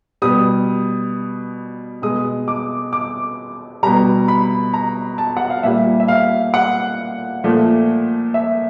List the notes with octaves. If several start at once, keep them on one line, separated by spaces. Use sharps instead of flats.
B2 G3 D#6
B2 G#3 D#6
D6
D6
B2 G3 A#5
B5
A#5
A5
F#5
F5
A#2 G3 E5
E5
F5
F#5
A#2 F3 A3
E5